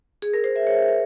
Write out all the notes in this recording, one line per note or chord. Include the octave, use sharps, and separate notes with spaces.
G#4
A#4
C5
E5
C#5
A#4